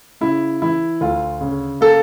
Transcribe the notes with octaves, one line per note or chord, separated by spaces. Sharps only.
C#3 E4
E3 E4
D2 F4
C#3
A#3 A4